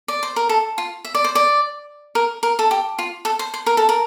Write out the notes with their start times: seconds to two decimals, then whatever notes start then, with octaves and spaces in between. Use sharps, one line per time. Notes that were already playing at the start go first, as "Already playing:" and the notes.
0.08 D5
0.23 C5
0.36 A#4
0.49 A4
0.78 F4
1.04 E5
1.15 D5
1.24 C5
1.35 D5
2.15 A#4
2.43 A#4
2.59 A4
2.71 G4
2.99 F4
3.25 A4
3.39 C5
3.54 C5
3.66 A#4
3.77 A4
3.89 A#4